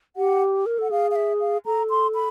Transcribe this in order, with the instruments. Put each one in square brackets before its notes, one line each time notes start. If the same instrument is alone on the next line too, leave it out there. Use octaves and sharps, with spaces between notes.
[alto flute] G4 [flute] F#5
[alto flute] A#4
[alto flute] A4 [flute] F#5
[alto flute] G#4 [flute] F5
[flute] F5
E5
F5
[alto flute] A4 [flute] A#5
[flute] C6
B5